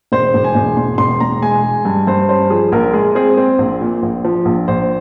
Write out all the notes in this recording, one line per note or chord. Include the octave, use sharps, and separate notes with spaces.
E1 C5
E1
G#5
E1
E1 C6
E1 C6
E1 A#5
G#3 G#5
G#3
G2
G2 C5
C#4 C5
F3 G#4
A#1 A#4
G#3 G#4
C4 G#4
C4
A#1
A#2
A#1
F3
A#1
A#1 C5